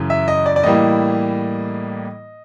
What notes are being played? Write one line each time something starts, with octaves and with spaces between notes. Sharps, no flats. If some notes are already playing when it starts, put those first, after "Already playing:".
Already playing: F#2 C#3 E3
E5
D#5
D5
D5
A2 E3 G3 A#3 D#5